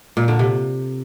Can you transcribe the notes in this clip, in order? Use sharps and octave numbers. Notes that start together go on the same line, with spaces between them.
A#2
D3
C3